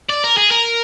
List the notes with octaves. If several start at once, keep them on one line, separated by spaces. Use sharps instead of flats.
D5
A#4
G#4
A#4